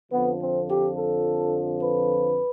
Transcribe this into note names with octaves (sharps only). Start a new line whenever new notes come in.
F2 D3 F3 B3
C4
G4
A4
B4